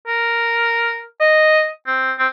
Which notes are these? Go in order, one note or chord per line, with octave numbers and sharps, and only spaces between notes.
A#4
D#5
C4
C4